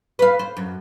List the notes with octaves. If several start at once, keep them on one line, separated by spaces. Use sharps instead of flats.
B4 F5
C5
F#2